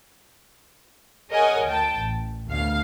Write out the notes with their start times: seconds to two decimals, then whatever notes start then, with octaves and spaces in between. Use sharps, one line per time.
1.31 G#4 A#4 C#5 D#5 F#5 G#5
1.67 D2 G5 A5
1.97 A1
2.48 D2 B2 F5